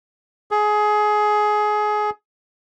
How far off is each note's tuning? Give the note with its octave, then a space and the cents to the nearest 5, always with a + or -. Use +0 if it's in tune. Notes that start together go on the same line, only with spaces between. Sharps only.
G#4 +20